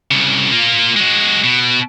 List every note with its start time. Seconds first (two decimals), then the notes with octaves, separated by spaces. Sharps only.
0.11 C2 C#3
0.52 A#3 F4
0.96 G#3 F#4
1.44 B2